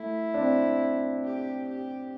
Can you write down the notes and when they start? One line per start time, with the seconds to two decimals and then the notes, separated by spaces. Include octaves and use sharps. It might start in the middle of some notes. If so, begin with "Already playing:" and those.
Already playing: A3 E4
0.34 D4
0.39 C4
1.25 G4
1.68 G4